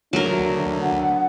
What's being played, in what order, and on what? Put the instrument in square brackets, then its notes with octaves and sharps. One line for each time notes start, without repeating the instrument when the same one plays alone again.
[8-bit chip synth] D2 [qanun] F#3 A#4 [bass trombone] D4
[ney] F#5